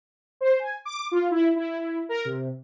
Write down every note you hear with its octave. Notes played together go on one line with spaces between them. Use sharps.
C5
G#5
D6
F4
E4
E4
A#4
C3